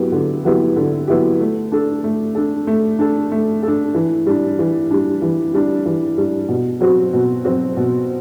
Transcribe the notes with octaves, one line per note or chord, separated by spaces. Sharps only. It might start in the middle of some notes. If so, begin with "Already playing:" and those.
Already playing: F#3 B3 E4 G4
D3
F#3 B3 E4 G4
D3
F#3 B3 E4 G4
A3
D4 A4
A3
D4 A4
A3
D4 A4
A3
A4
D4
E3
G3 D4
E3
G3 D4
E3
G3 D4
E3
G3 D4
B2
F#3 C4 F#4
B2
F#3 C4 F#4
B2